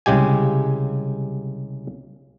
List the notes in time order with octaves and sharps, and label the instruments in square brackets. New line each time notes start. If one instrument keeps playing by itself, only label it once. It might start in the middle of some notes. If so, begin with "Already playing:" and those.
[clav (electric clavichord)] C2 C#3 G#3 G4 G#5